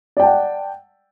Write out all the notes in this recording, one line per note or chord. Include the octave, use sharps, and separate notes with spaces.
D5 F#5 G5 A5